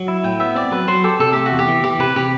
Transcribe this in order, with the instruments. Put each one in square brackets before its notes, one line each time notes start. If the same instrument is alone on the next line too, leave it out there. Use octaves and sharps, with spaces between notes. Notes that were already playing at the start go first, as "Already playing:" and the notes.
Already playing: [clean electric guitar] F#3
E4
[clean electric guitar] A2 [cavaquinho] G5
[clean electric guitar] B3 [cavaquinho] E5
[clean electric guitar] C4 [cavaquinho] D5
[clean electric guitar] F#3 [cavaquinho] B4
[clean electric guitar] F#3 [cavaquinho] C5
[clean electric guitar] G4 [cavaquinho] A4
[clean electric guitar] C3 [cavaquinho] A4
[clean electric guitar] A3 [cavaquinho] G4
[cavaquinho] F#4
[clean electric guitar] E2
[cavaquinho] G4
[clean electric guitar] E3
[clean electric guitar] E3 [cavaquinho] G4
[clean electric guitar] C3 [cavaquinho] B4
[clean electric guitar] C3 [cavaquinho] G4